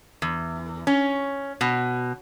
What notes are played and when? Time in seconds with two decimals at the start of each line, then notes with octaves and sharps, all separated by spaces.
0.22 E2
0.87 C#4
1.61 B2